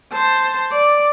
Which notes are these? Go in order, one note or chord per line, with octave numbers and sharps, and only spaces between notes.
C5 A5
D5